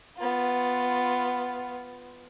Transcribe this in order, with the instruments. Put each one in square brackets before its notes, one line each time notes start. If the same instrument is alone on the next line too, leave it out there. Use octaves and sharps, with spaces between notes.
[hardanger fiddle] B3 F4